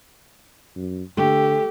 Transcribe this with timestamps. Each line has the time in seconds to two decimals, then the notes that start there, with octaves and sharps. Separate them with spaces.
0.76 F#2
1.17 D3 A3 G4